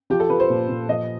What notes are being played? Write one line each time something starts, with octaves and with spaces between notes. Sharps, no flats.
F3 G4
A4
F3 B4
C5
A#2
A#2
F3 D#5